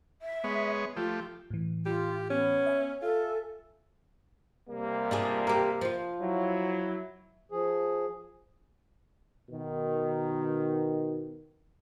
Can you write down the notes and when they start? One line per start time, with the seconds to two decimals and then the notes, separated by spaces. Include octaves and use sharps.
0.22 E5
0.44 G#3 B3 C#5
0.96 F3 A3 F4 G4
1.50 A2 E3
1.86 F4 G4
2.30 B3 C#4
2.66 E5 G#5
3.02 F4 A4
4.69 C3 G3 A#3
5.11 D4 F4 G#4
5.47 G4 A#4
5.81 F3 F4
6.21 F#3 E4
7.52 F3 G#4
9.50 B2 D#3